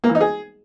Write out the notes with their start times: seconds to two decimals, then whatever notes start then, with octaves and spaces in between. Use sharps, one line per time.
0.04 A#3
0.09 E3
0.15 D#4
0.21 G#4